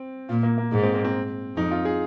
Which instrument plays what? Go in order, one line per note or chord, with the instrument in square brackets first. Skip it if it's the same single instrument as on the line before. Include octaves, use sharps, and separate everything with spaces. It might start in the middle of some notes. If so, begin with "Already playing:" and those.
Already playing: [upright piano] C4
[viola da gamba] A#2 [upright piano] F4
[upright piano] A#3
A#3
[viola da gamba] G#2 [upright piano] D#4
[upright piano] C4
A#3
C4
[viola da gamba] F2 [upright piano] D#4
[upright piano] F4
G#4